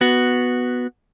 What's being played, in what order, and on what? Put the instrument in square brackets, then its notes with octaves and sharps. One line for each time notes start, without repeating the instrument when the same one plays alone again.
[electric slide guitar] B3 F#4